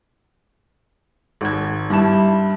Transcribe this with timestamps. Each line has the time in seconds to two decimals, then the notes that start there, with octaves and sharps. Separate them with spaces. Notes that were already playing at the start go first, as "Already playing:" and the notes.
1.41 G#1 G#6
1.90 G2 G3 E4 A5 E7